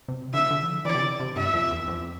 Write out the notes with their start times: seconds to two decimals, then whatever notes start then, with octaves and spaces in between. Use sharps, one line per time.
0.08 C3
0.34 D3 E5
0.51 D3
0.62 E3
0.68 F3
0.85 E3 D5
0.95 C3
1.02 D3
1.20 C3
1.36 G2 E5
1.54 F2
1.71 E2
1.88 F2